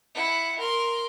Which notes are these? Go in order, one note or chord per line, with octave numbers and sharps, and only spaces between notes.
E4 F#5
A#4 C6